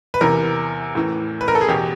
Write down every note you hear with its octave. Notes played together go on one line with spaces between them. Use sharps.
B4
E2 C3 E3 A#4
A2 E3
B4
A#4
A4
G#4
E2 B2 G4